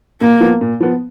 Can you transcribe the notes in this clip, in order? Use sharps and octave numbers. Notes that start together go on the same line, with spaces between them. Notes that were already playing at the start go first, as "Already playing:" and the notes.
A#2 A#3
F3 B3
A#2
F3 B3